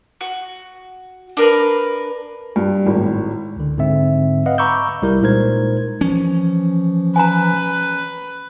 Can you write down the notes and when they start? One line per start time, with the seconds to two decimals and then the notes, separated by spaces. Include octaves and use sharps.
0.21 F#4
1.37 D4 A#4 B4
2.56 G2
2.86 G#1 A2
3.56 C#2 D3
3.78 G#2 D3 C4 E5
4.46 B4 D#5 F5 F#5
4.58 A#5 B5 C#6 D6 E6 G6
5.02 C2 G3 E4 A#4
5.21 A#2 G#3 D#4 A#4 C5 G#6
6.01 E3 F3 C#4
7.16 B4 G#5 A#5